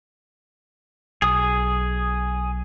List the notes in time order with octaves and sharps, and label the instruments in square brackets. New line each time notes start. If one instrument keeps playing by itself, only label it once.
[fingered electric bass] B1 [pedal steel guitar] G#4 D#6